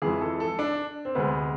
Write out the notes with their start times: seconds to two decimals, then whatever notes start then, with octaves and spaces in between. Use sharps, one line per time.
0.02 F2 E3 G#3 G#4
0.21 A4
0.40 A4
0.59 D4
1.05 C4
1.15 D2 C3 G#3 B3